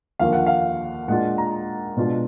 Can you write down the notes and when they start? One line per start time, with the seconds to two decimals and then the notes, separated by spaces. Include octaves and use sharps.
0.19 D#2 D3 F3 A#3 F4 F5
0.33 F#5
0.46 F5
1.08 A#2 G#3 D4 F4 F#5
1.38 A#5
1.97 B2 G#3 D4 F4